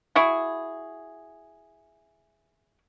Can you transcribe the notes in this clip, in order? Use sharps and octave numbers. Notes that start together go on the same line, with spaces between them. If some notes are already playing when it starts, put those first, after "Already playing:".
E4 F#4 G#4